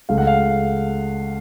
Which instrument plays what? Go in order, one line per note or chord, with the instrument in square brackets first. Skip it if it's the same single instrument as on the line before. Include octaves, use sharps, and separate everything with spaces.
[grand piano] C#2 C#3 A3 F5
F#5
F5